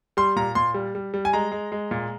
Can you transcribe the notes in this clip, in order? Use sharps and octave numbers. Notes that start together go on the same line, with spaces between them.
G3 C6
A#2 A#5
A#2 C6
G3
G3
G3
G#5
G#3 A#5
G#3
G#3
A#2